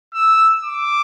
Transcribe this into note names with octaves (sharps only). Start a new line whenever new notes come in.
E6
D6